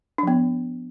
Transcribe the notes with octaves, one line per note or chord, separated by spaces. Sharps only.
F3 B3 D4